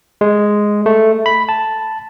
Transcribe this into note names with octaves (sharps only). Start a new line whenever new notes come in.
G#3
A3
B5
A5